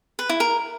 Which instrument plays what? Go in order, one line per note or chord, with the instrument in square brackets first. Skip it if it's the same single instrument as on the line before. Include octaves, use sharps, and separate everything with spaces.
[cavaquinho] B4
E4
A#4